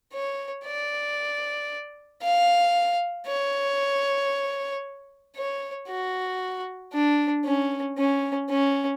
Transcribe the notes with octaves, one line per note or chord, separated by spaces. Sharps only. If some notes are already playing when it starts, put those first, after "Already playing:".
C#5
D5
F5
C#5
C#5
F#4
D4
C#4
C#4
C#4